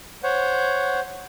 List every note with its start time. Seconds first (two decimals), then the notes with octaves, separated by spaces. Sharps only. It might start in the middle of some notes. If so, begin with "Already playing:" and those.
0.23 C5 C#5 F#5